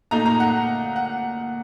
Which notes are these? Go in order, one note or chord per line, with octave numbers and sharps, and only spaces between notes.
A#2 A3 D#4 A#5
A#5
F#5
F#5